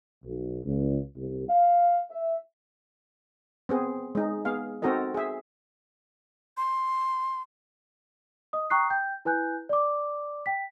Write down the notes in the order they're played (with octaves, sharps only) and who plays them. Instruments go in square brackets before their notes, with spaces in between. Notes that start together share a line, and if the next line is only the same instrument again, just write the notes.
[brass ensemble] B1
C#2
C2
F5
E5
[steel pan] B3 C4 G#4
G#3 D#4
B3 G#4 F5
C4 D#4 F#4 A4 A#4 D#5
G#4 E5
[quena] C6
[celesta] D#5 D#6
G5 A#5 C#6 D#6 F#6 C7
G5 G6
E4 B4 G#5 F#6 G6
D5 D6
G5 B6